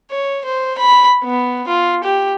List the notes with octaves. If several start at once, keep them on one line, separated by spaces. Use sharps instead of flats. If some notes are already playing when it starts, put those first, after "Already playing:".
C#5
C5
B5
B3
F4
G4